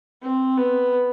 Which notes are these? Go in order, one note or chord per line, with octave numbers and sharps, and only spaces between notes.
C4
B3